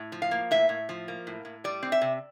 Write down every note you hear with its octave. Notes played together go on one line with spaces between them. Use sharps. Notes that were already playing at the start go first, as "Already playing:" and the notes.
Already playing: A2
F3
F5
A#3
A2 E5
A2
F3
A#3
A2
A2
G3 D5
C4
E5
C3